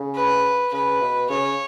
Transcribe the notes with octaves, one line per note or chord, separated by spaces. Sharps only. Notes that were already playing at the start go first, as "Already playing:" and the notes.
Already playing: C#3
B4
C#3 B4
B2
C#3 C#5